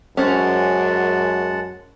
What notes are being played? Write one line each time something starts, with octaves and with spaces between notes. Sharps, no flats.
F#2 G#3 C#4 C5 F#5 A5